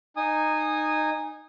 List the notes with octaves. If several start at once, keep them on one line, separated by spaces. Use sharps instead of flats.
D#4 G#5 D#6